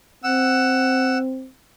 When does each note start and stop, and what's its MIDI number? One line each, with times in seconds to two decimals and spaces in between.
0.24 1.50 60
0.24 1.18 78
0.24 1.18 88